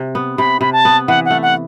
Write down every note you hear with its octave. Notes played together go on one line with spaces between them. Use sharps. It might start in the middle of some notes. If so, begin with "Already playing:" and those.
Already playing: C3
B3
C3 B5
C3 B5
A5
B3
E3 F#5
F#5
A3
F#5